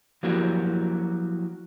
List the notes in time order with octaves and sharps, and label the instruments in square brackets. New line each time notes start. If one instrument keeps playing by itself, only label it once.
[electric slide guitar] F3 F#3 A#3 E4 F#4 G4